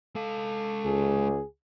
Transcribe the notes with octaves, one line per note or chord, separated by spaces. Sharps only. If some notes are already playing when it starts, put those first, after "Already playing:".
G#3 A4 F5
C#2 G#4